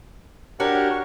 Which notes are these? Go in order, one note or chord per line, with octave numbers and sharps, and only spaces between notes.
D4 F#4 G4 A#4 C#5 F#5
C#6